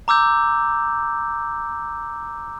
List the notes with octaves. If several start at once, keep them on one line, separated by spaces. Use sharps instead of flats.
A#5 D6 E6 G6